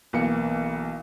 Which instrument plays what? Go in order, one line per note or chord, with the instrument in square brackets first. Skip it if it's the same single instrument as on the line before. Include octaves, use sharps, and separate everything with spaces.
[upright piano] B1 B2 E3 A#3 C#7